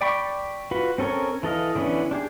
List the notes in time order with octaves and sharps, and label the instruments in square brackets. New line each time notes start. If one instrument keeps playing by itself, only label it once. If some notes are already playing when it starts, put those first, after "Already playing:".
[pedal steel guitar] D5 G5 B5 C#6
F4 F#4 B4
C4 C#4 A4 A#4 C#5
E3 A4 D#5 F5
D3 E3 B3 C#4 D4
D4 G4 G#4